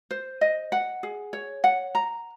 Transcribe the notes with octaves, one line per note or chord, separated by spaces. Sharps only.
C5
D#5
F#5
G#4
C#5
F#5
A#5